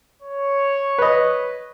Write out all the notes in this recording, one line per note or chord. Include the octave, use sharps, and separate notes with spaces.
C#5
B4 D#5